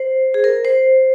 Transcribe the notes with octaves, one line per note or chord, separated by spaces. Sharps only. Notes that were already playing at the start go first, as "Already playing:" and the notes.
Already playing: C5
G#4
A#4
C5